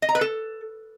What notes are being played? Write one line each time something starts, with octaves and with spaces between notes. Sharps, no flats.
D#5
A#5
B4
A4